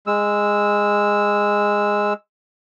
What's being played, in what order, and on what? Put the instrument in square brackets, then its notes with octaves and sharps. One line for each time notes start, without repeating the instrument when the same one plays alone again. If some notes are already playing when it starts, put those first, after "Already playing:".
[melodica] G#3 E6